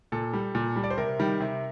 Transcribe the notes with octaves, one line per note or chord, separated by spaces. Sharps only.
A#2 A4
G3
A#2
G3
D5
C5
C3 A#4
D#3 G3
C3